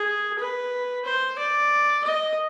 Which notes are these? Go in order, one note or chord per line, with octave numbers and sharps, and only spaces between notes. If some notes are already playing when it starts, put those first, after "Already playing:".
Already playing: G#4
B4
C5
D5
D#5